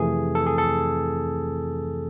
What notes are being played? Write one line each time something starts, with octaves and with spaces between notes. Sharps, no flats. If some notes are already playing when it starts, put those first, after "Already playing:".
Already playing: F2 C3 E3 A3 G#4
A4
G#4
A4